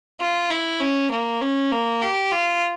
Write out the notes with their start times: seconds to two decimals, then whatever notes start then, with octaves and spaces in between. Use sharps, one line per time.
0.20 F4
0.50 E4
0.80 C#4
1.11 A#3
1.41 C#4
1.72 A#3
2.02 G4
2.32 F4